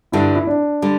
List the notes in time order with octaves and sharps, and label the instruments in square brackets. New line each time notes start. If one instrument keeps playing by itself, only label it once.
[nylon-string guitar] G2 D3 G3 [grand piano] E4
[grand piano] E4
D4
[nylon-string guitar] D3 G3